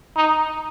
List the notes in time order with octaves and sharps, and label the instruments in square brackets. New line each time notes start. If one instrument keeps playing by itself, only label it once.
[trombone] D#4